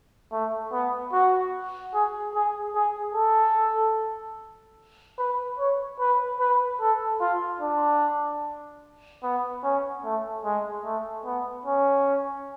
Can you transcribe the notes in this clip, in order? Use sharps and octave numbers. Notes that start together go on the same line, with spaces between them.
A3
B3
F#4
G#4
G#4
G#4
A4
B4
C#5
B4
B4
A4
F4
D4
B3
C#4
A3
G#3
A3
B3
C#4